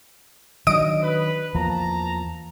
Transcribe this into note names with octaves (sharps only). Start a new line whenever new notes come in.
D#3 F#3 D4 D#5 D#6 D7
B4
E2 F3 A#3 A5 A#5